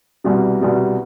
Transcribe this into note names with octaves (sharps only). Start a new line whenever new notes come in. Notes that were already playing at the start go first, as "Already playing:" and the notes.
C2 B2 G3
C2 B2 G3